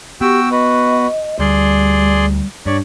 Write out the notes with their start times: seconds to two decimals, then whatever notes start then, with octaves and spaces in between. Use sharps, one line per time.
0.21 B3 F#4 G4 G5 E6
0.51 F#4 B4 D#5
1.40 D2 G3 G#4 D5 C6
2.66 G2 D4 C#5 D5